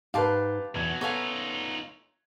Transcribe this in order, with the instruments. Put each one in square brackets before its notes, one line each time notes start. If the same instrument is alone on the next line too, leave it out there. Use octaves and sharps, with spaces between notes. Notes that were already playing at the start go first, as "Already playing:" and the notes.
[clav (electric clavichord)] G#2 [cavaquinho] G4 A5 C6 [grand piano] B4 F5
[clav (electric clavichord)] E2 [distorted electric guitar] B2 F#3 [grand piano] G#6
[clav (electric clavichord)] B3 A4 F5 [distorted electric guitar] D#4 F4 [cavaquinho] C#5 E5 G#5